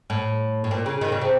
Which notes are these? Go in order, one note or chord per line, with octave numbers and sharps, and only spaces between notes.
A2
A2
A#2
C#3
D#3
C#3
C3